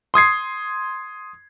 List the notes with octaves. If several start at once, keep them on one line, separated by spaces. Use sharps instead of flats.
C6 D#6 G#6 C7